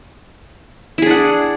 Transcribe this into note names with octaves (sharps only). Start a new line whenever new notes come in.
D4 E4 G#4 F#5